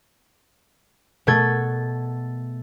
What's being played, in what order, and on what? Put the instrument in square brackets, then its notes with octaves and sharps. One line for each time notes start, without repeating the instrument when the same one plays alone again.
[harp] B2 A3 A4 G#6